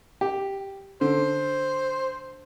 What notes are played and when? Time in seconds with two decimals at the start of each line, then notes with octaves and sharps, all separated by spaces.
0.21 G4
1.01 D3 C5